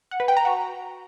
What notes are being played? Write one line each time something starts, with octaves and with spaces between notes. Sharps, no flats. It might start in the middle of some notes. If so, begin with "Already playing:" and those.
F#5
B4
G5
A#5
F#4